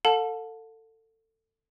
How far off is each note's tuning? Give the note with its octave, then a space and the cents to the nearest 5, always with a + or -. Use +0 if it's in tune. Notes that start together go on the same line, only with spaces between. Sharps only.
A4 +25 F#5 -45 A5 +0